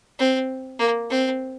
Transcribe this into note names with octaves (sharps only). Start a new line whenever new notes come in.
C4
A#3
C4